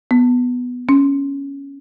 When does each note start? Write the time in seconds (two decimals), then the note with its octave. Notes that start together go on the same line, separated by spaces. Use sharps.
0.11 B3
0.89 C#4